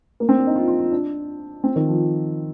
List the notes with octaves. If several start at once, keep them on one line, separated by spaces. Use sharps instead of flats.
A#3
C4
D4
D#4
F4
F4
F4
D4
C4
D#3
F3